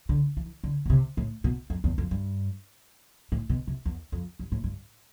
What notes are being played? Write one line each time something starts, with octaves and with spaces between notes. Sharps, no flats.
D3
E3
D3
B2
C3
A2
B2
F2
E2
F2
G2
A2
B2
C3
E2
F2
G2
A2
G2